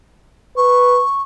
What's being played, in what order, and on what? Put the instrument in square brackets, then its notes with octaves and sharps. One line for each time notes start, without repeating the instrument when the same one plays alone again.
[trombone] B4 [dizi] C#6